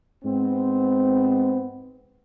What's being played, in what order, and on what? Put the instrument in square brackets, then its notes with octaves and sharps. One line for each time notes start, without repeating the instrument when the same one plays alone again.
[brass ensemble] G#2 B3 C4